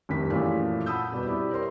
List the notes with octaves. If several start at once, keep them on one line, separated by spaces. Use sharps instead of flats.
F1 C2 D#3 G4 B6
F#2 A#2 E3 F3 A3
F#5 A5 B5 D#6 E6 G6
B2 G3 B4
C4 E4 G4 D5
A#4 C5 C#5 C6